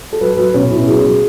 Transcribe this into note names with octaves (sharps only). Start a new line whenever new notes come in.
A4
F#3 B4
F#3 B4
B2 C#4
B2 E4
F#3 G#4
F#3